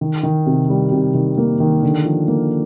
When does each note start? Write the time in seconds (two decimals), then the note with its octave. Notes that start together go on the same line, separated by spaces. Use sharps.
0.01 D#3
0.23 D#3
0.46 C3
0.69 G3
0.92 C3
1.14 D#3
1.38 A#3
1.60 D#3
1.83 D3
2.05 F3
2.28 A#3